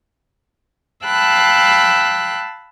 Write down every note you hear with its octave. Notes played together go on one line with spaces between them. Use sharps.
F5 G5 A5 B5 E6 F#6